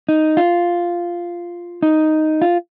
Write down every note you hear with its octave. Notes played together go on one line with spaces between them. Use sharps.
D#4
F4
D#4
F4